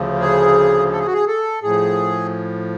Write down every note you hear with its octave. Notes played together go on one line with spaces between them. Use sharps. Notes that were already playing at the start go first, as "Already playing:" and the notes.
Already playing: D2 C#3 F3
G#4
A4
G#4
F#4
G#4
A4
A2 F3 G#4